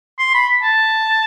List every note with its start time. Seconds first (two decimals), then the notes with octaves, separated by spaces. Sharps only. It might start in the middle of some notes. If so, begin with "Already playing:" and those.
0.19 C6
0.35 B5
0.63 A5